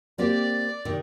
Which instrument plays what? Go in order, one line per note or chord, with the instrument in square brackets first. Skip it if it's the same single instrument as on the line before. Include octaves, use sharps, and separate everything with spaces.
[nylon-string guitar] A#3 C4 G4 [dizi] D5
[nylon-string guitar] C3 D#3